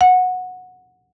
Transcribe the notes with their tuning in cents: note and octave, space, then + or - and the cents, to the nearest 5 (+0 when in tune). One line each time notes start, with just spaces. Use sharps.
F#5 -15